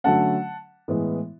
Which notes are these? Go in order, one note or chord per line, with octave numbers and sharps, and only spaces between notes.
D3 F#3 A3 C#4 F#5 A5
A2 E3 G#3 B3